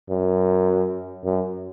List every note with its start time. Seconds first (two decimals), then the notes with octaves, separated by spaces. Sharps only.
0.10 F#2
1.24 F#2